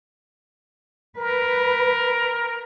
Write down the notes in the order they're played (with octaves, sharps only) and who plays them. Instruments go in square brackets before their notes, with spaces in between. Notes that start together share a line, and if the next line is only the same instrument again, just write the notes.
[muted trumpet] A#4 [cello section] B4